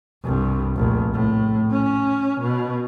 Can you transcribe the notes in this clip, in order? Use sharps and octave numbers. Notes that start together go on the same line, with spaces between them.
C2 G2
F1 A#1
A2
C#4
B2